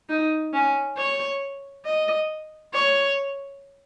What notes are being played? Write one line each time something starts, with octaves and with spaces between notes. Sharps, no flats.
D#4
C#4
C#5
D#5
C#5